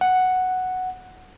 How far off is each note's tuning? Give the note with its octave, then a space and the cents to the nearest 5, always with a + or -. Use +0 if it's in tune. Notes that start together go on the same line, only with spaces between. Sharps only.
F#5 +0